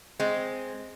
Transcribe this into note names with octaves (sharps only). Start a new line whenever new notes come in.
G#3 C4